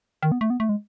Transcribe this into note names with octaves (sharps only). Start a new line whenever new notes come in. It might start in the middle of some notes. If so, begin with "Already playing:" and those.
D#3
B3
A3
B3
A3
G#3